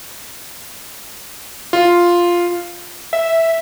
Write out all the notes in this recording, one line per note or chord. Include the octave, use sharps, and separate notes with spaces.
F4
E5